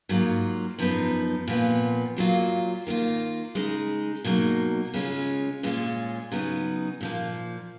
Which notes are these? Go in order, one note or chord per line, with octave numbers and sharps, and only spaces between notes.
G#2 F#3 A#3 F4
F#2 F3 B3 D#4
A#2 F3 B3 F4
A#2 F#3 A#3 F4
D#3 A#3 F4
C#3 G#3 D#4
B2 F#3 A#3 D#4
C#3 G#3 C#4 F4
A#2 G#3 C#4 F4
C#3 F#3 B3 D#4
A#2 F3 A#3